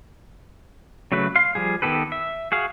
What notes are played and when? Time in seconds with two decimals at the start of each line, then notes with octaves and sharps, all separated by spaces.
1.12 C#3 F#3 A3 B4
1.36 F5 C6
1.55 F3 G3 G#4
1.82 D#3 B3 G4 A4 B4
2.12 E5
2.52 F#4 G#4 F5